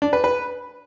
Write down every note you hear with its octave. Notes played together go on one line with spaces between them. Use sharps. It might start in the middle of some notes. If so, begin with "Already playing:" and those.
D4
B4
B4